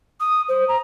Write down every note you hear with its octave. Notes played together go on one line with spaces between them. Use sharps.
D#6
C5
A#5